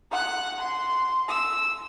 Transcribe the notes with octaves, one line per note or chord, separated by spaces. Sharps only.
F#5 F#6
C6
E6